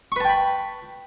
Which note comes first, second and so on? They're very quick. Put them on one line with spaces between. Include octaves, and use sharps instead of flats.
C#6 B4 A5 G5 B5